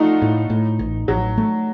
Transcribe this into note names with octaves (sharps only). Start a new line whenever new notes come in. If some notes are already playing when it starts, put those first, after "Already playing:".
Already playing: A3 D#4 F4 F#4
A2
A2
A1
A1 F#3
A3